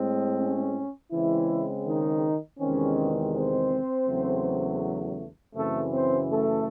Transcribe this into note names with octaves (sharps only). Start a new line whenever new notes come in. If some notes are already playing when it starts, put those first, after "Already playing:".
Already playing: A2 G#3 C4
C#4
C#3 E3 G#3 C4 E4
D#3 D#4
E2 C3 D#3 G#3 C4 C#4
C4 C5
E2 C#3 F#3 A3
F#2 C#3 E3 A3 C4 A4
C4 C5
A3 A4